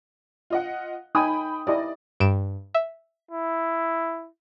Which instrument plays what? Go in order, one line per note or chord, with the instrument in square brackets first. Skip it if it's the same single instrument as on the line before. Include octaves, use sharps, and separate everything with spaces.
[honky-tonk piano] F4 D#5 F#5
[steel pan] D#4 G#5 [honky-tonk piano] G5 B5 D#6
[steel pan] E4 G4 D#5 [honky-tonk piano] D5
[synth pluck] G2 D7 E7
E5
[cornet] E4